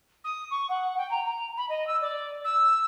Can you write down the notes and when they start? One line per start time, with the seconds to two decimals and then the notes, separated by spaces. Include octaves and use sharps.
0.24 D#6
0.51 C#6
0.69 F#5
0.97 G5
1.11 A#5
1.26 A#5
1.57 B5
1.69 D#5
1.87 E6
2.01 D5
2.44 E6